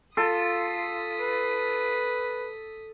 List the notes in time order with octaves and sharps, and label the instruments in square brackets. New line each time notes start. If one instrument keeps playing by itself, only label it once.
[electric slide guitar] F4 [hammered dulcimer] A4 [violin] D#6 B6
[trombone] B4